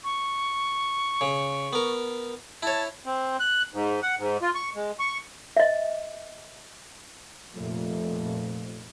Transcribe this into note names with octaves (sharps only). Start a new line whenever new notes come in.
C#6
C#3
B3 A#4
E4 C#5 A5
C4
F#6
G#2
F#5
G#2
F4
C#6
G#3
C#6
D#5 E5
F1 F2 A#2 F3 A3